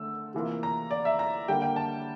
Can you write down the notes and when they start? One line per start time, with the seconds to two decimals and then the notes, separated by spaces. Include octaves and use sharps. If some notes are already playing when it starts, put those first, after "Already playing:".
Already playing: D3 A3 E6
0.34 C3 E3 A#3 F4
0.63 A#5
0.91 D5
1.05 E5
1.19 A#5
1.48 D3 G3 A#3 G5
1.62 G5
1.76 A5